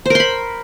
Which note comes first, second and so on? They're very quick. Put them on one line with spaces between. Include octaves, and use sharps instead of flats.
C5 A#4 C6 B5